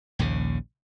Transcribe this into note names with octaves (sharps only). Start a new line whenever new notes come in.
A#1 D#2 C#3